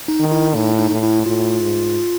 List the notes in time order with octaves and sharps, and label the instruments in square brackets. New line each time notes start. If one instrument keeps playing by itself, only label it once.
[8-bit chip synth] D#4
[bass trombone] D#3
[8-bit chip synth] E4
[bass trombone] A2 [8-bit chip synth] D#4
[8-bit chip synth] D#4
[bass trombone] A2
[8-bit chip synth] E4
[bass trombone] A2 [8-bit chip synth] F4
[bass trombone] G#2